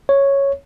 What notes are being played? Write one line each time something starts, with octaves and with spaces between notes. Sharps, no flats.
C#5